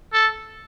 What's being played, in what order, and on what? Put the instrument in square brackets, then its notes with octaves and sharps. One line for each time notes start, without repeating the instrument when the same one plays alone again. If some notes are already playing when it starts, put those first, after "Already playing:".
[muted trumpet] A4